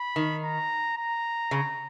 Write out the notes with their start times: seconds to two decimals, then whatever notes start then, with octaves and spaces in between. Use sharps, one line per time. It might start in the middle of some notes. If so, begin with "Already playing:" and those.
Already playing: B5
0.16 D#3
0.44 A#5
0.97 A#5
1.51 C#3